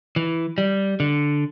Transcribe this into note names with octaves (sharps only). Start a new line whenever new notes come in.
E3
G3
D3